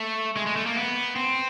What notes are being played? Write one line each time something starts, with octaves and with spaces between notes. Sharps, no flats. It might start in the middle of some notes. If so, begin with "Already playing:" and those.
Already playing: A3
G#3
G#3
A3
A#3
B3
C4